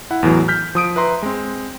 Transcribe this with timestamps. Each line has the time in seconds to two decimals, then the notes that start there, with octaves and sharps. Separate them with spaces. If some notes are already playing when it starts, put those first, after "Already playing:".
0.11 E4 F#5
0.23 E2 A2 E3 F#3
0.48 F6 G6 B6
0.75 F3 D#6 D7
0.96 B4 E5 A#5 C6
1.23 G#3 C4